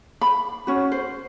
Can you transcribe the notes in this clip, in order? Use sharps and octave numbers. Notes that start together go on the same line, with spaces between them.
B5
C#4 F#4
C5